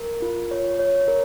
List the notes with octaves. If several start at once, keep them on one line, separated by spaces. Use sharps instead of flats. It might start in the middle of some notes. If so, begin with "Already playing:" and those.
Already playing: A#4
F4
C#5
C#5
A#4